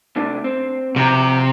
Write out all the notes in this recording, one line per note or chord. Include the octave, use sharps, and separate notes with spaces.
C3 A3 D4
C4
C3 F3 G4 A#5